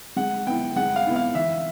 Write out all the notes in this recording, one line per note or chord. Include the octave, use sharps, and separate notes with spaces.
G#3 F#5
B3 E4 G5
G#3 F#5
F5
B3 E4
F5
E3 E5